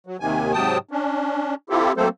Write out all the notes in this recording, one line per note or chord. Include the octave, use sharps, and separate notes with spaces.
F#3
D#2 C3 D#3 G#5
G#2 C3 F#3 G5 A5 D#6
C#4 D4
C4 E4 F4 G4 A4
F#3 A3 A#3 C4 A4 C5